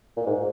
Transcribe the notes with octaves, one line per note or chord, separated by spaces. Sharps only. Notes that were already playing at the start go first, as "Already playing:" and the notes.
A#2
G#2